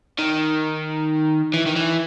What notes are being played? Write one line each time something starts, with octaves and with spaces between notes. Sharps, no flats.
D#3
E3
D#3
E3